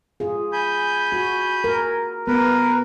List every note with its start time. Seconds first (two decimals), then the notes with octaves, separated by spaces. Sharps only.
0.20 F4 G#4
0.52 G#5 B5 G6
1.12 F#4
1.64 A#4
2.27 B3 A#4 B4